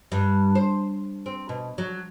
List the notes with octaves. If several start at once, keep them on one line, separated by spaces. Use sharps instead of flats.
G2
C5
C4
B2
F#3